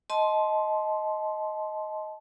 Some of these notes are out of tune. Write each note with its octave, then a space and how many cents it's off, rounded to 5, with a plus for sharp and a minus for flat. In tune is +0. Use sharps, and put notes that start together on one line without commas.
D#5 +10 A5 -25 C6 +0